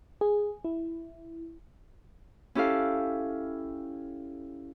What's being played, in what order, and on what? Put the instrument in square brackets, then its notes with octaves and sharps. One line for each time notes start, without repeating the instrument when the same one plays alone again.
[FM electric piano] G#4
E4
[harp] C#4 E4 G4 A4 F5